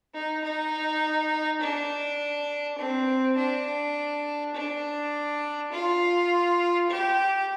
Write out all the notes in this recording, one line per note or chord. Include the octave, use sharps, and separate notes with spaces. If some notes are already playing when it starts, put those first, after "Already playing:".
D#4
D#4
D4
C4
D4
D4
F4
G4